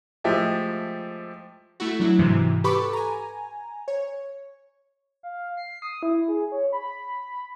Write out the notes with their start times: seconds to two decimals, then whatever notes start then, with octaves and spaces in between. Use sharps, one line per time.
0.24 F3 G#3 A3 G4 E5
1.80 A3 E4 F#4
2.00 F#3 D4 E4
2.19 G#2 C3 E3
2.64 G4 A4 B4 B5 C#6 D6
2.93 G#5 A#5
3.88 C#5
5.23 F5
5.57 C7
5.82 D#6
6.03 E4
6.28 G#4
6.52 C#5
6.73 B5